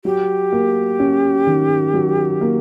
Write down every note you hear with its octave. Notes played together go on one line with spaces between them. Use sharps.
F#3 G4
A#3
C#4
D#3
F#3
A#3